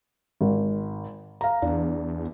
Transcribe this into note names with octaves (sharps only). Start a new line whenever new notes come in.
G#1
F5 A#5
E2 D4